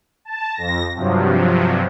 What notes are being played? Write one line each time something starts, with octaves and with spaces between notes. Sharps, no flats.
A5
F2 A#6
G2 C3 F3 F#3